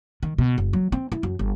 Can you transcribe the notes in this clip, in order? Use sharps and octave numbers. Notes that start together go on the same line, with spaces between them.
D#3
B2
F#1
F#3
C4
E4
F#2
G1